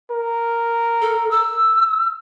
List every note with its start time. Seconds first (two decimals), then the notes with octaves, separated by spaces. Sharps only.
0.10 A#4
1.02 A4
1.31 E6